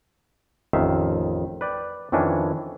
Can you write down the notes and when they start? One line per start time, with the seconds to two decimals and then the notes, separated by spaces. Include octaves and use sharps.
0.73 A1 F2 D#3 E5 F5
1.61 B4 D5 G5
2.12 F2 D#3 E3 C#4 D4 G#5